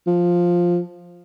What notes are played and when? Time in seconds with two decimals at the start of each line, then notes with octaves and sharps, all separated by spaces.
0.07 F3